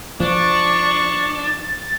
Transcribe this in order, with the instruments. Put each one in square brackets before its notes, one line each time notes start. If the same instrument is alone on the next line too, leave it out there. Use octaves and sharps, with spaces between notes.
[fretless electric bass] F3 [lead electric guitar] D4 [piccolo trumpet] C#6 [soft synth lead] A6